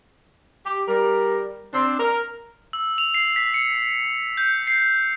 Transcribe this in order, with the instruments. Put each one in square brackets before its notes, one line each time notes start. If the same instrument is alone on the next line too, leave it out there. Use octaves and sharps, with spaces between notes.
[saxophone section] G4
G3 A#4
C4 D4
A#4
[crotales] E6
F7
C7
B6
C#7
G6
C7